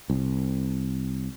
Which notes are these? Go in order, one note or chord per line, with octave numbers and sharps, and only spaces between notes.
C2